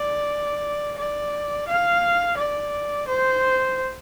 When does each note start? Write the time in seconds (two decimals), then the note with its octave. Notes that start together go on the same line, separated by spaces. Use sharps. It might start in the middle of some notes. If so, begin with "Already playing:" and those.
Already playing: D5
0.98 D5
1.68 F5
2.37 D5
3.07 C5